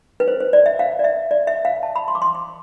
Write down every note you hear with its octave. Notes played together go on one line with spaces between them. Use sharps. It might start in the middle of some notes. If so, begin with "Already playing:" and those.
B4
C5
C5
D5
E5
F5
D5
E5
D5
E5
F5
A5
B5
C6
D6
C6
C6